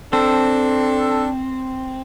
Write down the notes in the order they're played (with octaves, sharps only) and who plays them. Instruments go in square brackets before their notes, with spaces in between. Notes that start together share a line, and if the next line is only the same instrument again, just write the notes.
[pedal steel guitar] C4 [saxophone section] D4 A4